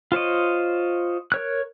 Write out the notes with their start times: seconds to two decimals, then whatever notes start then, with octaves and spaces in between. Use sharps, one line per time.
0.12 F4 C5 C#5 D#5
1.32 A#4 C#5 F#6